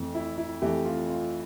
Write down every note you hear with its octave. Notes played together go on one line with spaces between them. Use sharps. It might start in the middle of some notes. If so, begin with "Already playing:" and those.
Already playing: F2 E3 A3
E4
E4
F2 E3 A3 G4
F4
F4